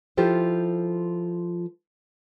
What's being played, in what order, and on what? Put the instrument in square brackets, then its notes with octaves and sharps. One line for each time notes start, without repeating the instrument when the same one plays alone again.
[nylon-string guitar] F3 E4 F4 G4 A4 C5